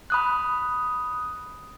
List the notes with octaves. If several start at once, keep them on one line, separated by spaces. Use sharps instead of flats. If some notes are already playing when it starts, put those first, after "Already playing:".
B5 D#6 F#6